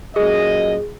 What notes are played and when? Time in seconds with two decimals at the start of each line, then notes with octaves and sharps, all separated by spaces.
0.16 F#2 A#2 G#4 D#5